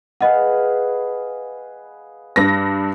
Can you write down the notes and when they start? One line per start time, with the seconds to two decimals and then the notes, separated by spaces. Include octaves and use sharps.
0.21 G#4 B4 D#5 F5 F#5
2.36 G2 A#6